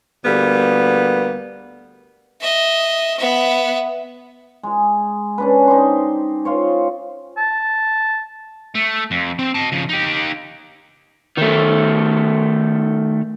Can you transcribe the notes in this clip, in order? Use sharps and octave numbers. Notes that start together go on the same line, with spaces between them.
D2 G3 A#3 B3
D#5 E5
B3 E5
G#3
C#4 D4 B4
D#4 G4 C5
F4 C5 C#5
A5
A3
F2
C4
D#5 A5
C#3 F3
D#4 G4
D#3 A3